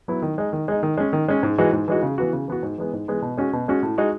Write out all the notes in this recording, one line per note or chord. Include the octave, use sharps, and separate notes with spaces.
F#3 B3 E4
D#3
G#3 D#4
D#3
G#3 D#4
D#3
G#3 C#4
D#3
G#3 C#4
G#2
E3 G#3 D#4 F#4
G#2
E3 G#3 D#4 F#4
C#3
E3 B3 F#4
C#3
E3 B3 F#4
G#2
E3 G#3 B3
G#2
E3 G#3 B3
B2
G#3 C#4 F#4
B2
G#3 C#4 F#4
A2
G#3 D#4 F#4